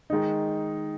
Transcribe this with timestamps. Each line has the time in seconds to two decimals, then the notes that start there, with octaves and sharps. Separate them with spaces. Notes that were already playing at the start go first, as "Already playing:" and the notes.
0.10 D#3 G#3 D#4